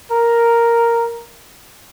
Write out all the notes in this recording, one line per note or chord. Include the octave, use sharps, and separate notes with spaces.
A#4